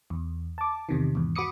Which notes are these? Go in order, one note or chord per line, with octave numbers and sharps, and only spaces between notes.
E2
A5 D6
E2 C3 D#3
E2 G#2
F#4 B5 D6 D#6 C#7